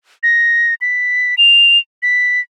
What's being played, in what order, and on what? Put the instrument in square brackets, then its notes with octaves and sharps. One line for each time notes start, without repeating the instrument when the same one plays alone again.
[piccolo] A#6
B6
F7
B6